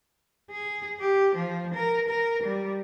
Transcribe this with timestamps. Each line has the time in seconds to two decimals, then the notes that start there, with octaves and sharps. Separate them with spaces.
0.51 G#4
1.00 G4
1.35 F3
1.74 A#4
2.08 A#4
2.43 G3